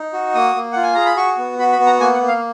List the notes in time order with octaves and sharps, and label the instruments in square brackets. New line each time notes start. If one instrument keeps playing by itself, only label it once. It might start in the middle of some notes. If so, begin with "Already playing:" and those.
Already playing: [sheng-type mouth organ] D#4
F#4
A#3 D#6
A#3
F4 F#5
G#5
G#4 A#5
B5
F#4 C#6
B3
F#4 B5
B5
B3
A#5
A#3 G#5
F#5
A#3
F5